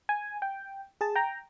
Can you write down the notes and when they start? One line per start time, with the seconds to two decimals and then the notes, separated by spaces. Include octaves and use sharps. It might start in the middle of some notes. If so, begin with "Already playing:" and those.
0.09 G#5
0.42 G5
1.01 G#4 A5
1.15 G5 A#5